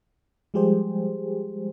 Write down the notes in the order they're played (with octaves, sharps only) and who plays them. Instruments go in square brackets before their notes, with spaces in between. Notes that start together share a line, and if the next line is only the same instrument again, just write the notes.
[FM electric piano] F3 G3 G#3 G4 G#4 C5